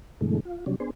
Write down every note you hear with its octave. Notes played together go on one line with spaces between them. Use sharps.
G2 B2 D3 E3 G#3 A3
F4
C3 F#3 G3 C#4 D4
B3 D4 G#4 C5